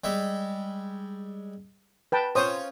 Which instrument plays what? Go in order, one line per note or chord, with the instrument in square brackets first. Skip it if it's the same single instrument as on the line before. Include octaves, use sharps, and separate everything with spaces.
[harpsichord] G3 G#3 E5
[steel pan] B4 G5 A5
[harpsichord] C#4 F4 C#5 [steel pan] C5 D#6